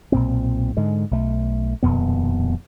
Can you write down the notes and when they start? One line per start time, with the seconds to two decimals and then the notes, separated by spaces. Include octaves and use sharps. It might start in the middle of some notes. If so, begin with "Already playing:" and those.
0.12 B1 A#2 C4
0.77 G#2 D3 G#3
1.11 B1 A3
1.83 D#1 F2 B2 B3